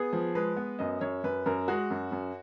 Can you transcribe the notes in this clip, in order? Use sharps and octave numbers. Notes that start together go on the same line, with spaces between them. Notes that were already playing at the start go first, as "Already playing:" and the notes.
Already playing: B3 G#4
F3
G#3 B4
B3
F#2 D#5
F#2 C#5
F#2 B4
F#2 A#4
G#3 F#4
F#2
F#2